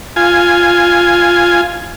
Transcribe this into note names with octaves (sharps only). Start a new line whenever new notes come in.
F4 G#5